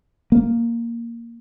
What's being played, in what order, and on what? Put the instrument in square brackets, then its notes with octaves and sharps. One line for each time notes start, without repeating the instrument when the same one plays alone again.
[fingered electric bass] A#3